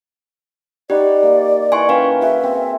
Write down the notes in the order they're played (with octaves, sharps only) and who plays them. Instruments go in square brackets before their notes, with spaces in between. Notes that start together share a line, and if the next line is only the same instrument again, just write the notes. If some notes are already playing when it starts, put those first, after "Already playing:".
[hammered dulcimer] D#4 F#5 B5 [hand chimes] G4 [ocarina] D5
[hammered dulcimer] A#3
[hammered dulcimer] E3 F#5 [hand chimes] G#5 C6 C#6
[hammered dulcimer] C#4 G5 A#5 [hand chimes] B4 F5
[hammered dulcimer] F#4 G#4 [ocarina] E5
[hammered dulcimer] C4